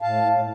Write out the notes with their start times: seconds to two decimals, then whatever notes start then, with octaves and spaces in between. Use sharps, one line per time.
0.01 A2 F5 A5
0.24 A2